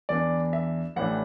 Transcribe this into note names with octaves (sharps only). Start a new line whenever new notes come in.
E2 E3 D4 D5
E5
A1 A2 E3 D4 F#5